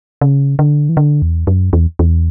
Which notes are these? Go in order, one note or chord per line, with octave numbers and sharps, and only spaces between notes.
C#3
D3
E3
D3
E2
F#2
E2
E2